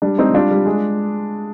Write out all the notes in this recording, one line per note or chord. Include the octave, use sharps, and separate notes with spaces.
G3 D4
G3 C4 D#4
G3 D4 F4
G3
G#3